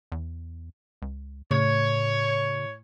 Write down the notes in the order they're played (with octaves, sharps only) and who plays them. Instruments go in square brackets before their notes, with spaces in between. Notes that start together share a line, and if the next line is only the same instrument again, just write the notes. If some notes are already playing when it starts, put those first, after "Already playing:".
[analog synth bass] E2
C#2
[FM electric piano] A2 [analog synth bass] C#3 [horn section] C#5